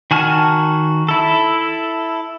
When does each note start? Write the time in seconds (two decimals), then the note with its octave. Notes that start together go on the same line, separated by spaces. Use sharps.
0.11 D#3 F#4 G#5 A5 F6
1.09 E4 A4